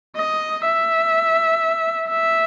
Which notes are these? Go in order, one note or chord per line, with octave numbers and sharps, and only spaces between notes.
D#5
E5
E5